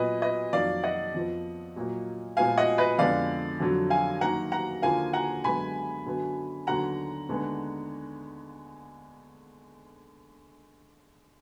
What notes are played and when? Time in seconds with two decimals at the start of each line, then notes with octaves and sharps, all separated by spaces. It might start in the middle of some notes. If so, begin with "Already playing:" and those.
Already playing: A#2 F#3 B3 B4 D#5
0.22 B4 D#5
0.53 F2 D#3 F#3 A#3 D5 F5
0.83 D#5 F#5
1.14 F2 F3 B3
1.76 A#2 F#3 A#3
2.37 A#2 F3 G#3 B3 F5 G#5
2.58 D#5 F#5
2.78 B4 D#5
2.98 F2 D3 G#3 B3 D5 F5
3.60 F2 D3 F#3
3.90 F5 G#5
4.21 F#2 D#3 A#3 F#5 A#5
4.52 F#5 A#5
4.82 D#2 D3 F3 A#3 F5 G#5
5.13 F#5 A#5
5.44 F#2 D3 G#3 B3 G#5 B5
6.06 F#2 D3 F#3 B3
6.67 D#2 D3 F#3 B3 F#5 A#5
7.29 D#2 D3 G#3 B3